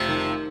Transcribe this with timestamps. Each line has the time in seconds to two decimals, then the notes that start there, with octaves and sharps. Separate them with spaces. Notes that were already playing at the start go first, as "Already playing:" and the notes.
Already playing: F1 C3 F3
0.08 D#3